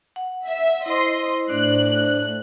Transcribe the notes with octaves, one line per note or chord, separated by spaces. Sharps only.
F#5
E5
E4 C5 D#5 C6
A2 D4 C5 D5 F#6